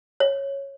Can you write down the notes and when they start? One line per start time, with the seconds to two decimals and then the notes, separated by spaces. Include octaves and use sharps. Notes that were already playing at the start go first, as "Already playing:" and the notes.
0.20 C#5